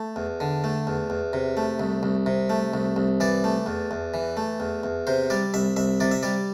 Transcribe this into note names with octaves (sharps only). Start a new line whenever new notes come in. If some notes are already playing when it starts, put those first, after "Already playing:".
Already playing: A3
E2
D3
A3
E2
E2
C3
A3
C2
C2
C3
A3
C2
C2
E3 D5
A3
E2
E2
E3
A3
E2
E2
C3 C5
G3 D5
C2 E5
C2 E5
C3 D5
E5
G3 D5